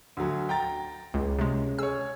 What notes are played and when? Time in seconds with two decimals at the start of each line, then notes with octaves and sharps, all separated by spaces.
0.17 D2 F#3
0.49 G5 A#5 A6
1.14 C#2 C#3
1.39 C3 G#3
1.78 G#4 C#5 E6